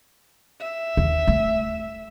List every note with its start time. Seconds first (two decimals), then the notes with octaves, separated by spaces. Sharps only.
0.60 E5
0.97 D#2
1.27 A3